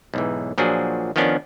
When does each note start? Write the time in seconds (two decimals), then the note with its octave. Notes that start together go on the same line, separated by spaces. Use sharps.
0.14 B1 G#2 E3
0.58 A#2 F3 F#3 D4 F#4 G#4
1.16 D#3 F3 B3 C#4 D4